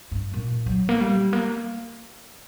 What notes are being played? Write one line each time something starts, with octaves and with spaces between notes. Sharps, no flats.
G2
A#2
F#3
A#3
G3
A#3